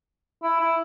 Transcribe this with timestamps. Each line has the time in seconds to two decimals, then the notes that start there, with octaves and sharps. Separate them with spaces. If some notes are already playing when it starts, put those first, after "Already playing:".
0.43 E4
0.60 E4